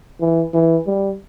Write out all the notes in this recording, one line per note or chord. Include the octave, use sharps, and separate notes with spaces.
E3
E3
G3